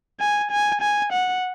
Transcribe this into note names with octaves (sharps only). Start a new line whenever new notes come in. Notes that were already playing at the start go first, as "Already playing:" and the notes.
G#5
G#5
G#5
F#5